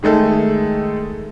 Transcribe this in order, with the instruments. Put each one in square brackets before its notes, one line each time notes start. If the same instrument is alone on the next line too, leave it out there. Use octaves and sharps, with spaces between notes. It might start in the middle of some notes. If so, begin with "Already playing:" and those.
[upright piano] D#3 G#3 A3 A4